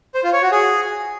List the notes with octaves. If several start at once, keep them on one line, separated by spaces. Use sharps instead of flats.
C5
F4
C#5
F#4
G#4